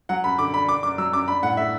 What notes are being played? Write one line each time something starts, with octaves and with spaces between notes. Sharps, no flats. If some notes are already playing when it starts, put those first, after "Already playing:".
F#3 F#5
F#2 B5
D3 D6
D4 B5
D4 D6
F#2 D6
F#3 E6
F#2 D6
D4 B5
A2 F#5
A3 E5